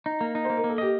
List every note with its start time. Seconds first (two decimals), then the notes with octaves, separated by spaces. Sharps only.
0.06 D#4
0.21 A#3
0.35 D#4
0.45 A#3 C5
0.57 A#4
0.64 A#3
0.69 A4
0.78 G4 D#5